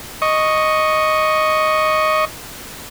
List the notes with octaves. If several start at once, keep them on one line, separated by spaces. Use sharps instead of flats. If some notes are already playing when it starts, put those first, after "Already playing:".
D#5 C#6